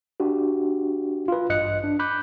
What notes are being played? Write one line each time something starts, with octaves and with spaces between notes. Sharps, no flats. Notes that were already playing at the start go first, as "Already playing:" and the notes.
D4 F#4 G4
F4 B4
A1 G2 D#5 F#6 C#7
D4
B5 D6 F#6 G6